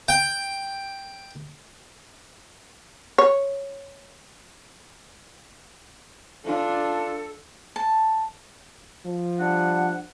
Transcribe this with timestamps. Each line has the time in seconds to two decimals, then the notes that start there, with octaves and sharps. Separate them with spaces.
0.08 G5
3.18 C#5
6.45 D4 F4 A4
7.76 A5
9.05 F3
9.39 G3 D4 F#5